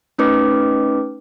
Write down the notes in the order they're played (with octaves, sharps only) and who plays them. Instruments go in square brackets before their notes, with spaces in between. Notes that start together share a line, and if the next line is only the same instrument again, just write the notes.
[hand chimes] A3 C#4 D#4 B4 D6